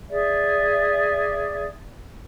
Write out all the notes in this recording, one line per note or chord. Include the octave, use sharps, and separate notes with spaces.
G#4 D5 E5